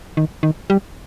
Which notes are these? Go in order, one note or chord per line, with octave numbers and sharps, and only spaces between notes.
D#3
D#3
G3